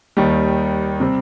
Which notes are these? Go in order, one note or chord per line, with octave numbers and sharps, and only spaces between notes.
D#2 D#3 G3
C3 G3 C4